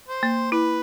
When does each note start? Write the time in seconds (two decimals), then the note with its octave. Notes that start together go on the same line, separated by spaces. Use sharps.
0.09 C5
0.23 A#3
0.52 E4 B4